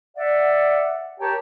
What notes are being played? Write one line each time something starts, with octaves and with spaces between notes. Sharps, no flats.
D5 E5 F#5
G4 A#4 C#5 G5 A5 A#5